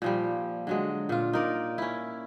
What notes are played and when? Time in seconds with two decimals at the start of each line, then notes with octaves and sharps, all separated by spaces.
0.02 A#2 F3 G3
0.67 D3 F#3 G#3
1.09 A#2 F4
1.33 D#4 A#4 D5
1.78 C#4 E4